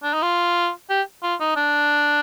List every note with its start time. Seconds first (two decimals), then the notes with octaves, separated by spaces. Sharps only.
0.03 D4
0.14 D#4
0.23 F4
0.90 G4
1.23 F4
1.40 D#4
1.56 D4